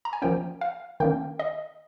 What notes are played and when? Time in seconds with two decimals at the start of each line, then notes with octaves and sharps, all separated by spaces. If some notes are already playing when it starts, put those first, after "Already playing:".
0.05 A#5
0.13 G#5
0.22 F3 A#3 C#4 G5
0.61 F5
1.00 D#3 A#3 C#4 G5
1.39 D#5